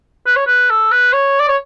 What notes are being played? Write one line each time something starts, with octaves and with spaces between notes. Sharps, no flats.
B4
C#5
B4
A4
B4
C#5
D5
C#5